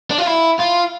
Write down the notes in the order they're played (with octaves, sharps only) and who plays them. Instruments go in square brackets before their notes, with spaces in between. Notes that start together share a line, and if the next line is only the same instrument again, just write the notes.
[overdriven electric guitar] D4
F4
E4
F4